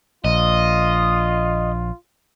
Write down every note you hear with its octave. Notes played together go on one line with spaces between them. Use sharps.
A#1 F4 D#5